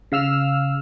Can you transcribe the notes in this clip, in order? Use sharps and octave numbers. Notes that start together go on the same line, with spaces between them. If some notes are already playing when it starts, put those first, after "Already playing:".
C#3 F5 E6 F6